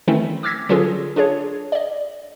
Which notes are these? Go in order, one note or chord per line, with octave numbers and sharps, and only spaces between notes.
D#3 E3 A3 C4 C#4 E4
D6 E6 F6 G#6 A#6 B6
D3 F#3 C#4 F4 G#4 A4
D4 F4 G#4 C#5
D5 D#5